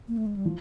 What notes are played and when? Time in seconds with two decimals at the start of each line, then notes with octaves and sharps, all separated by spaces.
0.08 A#3
0.17 A3
0.26 G#3
0.36 G3
0.45 F3